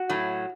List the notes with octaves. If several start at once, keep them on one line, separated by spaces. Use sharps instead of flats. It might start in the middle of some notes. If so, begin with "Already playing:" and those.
Already playing: F#4
A2 F#3 A3